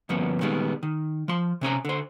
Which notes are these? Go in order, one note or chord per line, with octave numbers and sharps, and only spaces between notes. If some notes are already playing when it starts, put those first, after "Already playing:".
D2 G2 F3 A#3 B3 C#4
A#2 D#3 G3 G#3 B3
D#3
F3 C6
C3 C#4 G#5 A#5
D3 C5